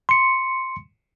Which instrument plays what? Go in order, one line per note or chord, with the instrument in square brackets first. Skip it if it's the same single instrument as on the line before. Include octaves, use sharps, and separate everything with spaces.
[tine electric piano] C6 C#7